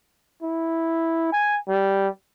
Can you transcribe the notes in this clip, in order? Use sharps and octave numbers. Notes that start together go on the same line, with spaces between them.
E4
G#5
G3